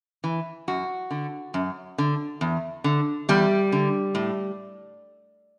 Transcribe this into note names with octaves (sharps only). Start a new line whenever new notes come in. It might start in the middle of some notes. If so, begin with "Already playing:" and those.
E3
F#2 F#4
D3
F#2
D3
E2
D3
E2 G3
D3
A2